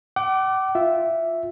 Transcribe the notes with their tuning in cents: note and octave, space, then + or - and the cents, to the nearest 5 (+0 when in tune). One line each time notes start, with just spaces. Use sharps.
F#5 +45 D6 +0
F4 +0 E5 +0